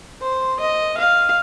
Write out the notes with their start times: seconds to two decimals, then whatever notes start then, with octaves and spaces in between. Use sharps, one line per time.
0.22 C5
0.60 D#5
0.97 F5